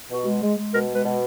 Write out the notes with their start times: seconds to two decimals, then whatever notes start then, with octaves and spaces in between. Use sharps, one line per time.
0.10 B2 F#4
0.26 G#3
0.42 G#3
0.58 G#3
0.73 B2 A#4
0.89 G#3
0.94 B4
1.04 B2